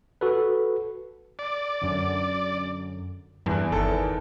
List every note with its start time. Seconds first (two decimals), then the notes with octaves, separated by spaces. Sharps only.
0.21 F#4 A4 B4
1.39 D5
1.81 F#2 D3
3.46 E2 G2 F#6
3.72 G1 D#3 A4